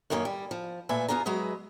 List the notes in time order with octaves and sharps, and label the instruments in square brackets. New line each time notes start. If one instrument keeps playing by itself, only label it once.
[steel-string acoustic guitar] F#2 D#3 A#3 B3 C#4 D#4
G3
F3
A#2 A3 B4 E5 G#5
E2 C#3 B3 F4 G#4 A#5
F#3 G#3 B4 D#5 E5